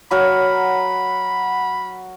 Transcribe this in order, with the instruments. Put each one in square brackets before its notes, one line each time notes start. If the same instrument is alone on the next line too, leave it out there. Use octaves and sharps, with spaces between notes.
[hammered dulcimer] F#3 A#4 F#5 [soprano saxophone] B5